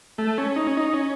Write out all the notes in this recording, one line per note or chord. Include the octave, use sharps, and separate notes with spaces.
A3
C#4
D#4
C#4
D#4
C#4